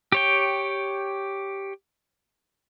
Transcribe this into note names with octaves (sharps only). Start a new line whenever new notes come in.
G4 C#5 G5